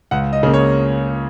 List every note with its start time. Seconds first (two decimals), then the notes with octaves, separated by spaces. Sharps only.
0.11 C#2 F#5
0.33 D#5
0.43 C#3 A#3
0.54 C#5